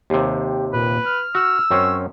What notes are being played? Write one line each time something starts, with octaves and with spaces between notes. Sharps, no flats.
D#2 C3 G4
A#2 B4
F6
F#4 E6
F#2 C4 C#4 C#5